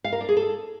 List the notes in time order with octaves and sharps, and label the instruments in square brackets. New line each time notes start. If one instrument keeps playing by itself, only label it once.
[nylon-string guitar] F5
A#4
D4
G#4
A4